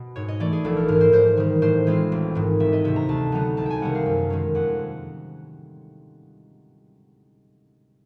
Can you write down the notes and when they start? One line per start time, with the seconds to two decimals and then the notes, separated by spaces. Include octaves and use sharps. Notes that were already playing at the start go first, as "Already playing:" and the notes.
Already playing: B2
0.16 G#2 C#5
0.28 D#5
0.40 E3 A3 D5
0.53 G#4
0.65 A#1 A4
0.77 A#4
0.88 G#2 E3 A#4
1.01 C5
1.13 G#2 C5
1.37 D#3 G3
1.62 A2 C5
1.87 E3 G#3 C4 F4
2.12 A1
2.35 G#2 D#3
2.60 E1 E5
2.73 D#5
2.84 D2 C3 E5
2.96 A#5
3.09 D2 A5
3.32 D3 F#3 B3 D#4 A#5
3.57 C2 A5
3.66 G5 G#5
3.82 C3 D#3 G3 A#3 F#5
3.95 F5
4.06 F#2
4.30 D#3 G#3 C#4
4.55 F2 F#5